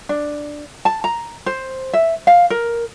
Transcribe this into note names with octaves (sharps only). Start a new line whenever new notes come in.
D4
A5
A#5
C5
E5
F5
A#4